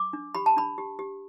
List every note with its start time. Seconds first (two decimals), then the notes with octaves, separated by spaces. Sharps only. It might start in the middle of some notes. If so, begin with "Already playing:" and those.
Already playing: D6
0.13 D4
0.35 G4 B5
0.46 A5
0.56 D4 B5
0.78 G4
0.99 G4